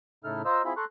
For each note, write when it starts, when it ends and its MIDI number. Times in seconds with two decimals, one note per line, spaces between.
0.24 0.42 45
0.24 0.42 49
0.24 0.42 63
0.24 0.42 64
0.24 0.42 69
0.24 0.42 89
0.45 0.62 65
0.45 0.62 72
0.45 0.62 75
0.45 0.62 82
0.45 0.62 88
0.65 0.73 60
0.65 0.73 64
0.65 0.73 65
0.65 0.73 68
0.65 0.73 76
0.65 0.73 83
0.77 0.85 69
0.77 0.85 82
0.77 0.85 84
0.77 0.85 85
0.77 0.85 90